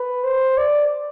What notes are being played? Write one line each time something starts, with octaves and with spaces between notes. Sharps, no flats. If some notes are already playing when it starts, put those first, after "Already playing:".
Already playing: B4
C5
D5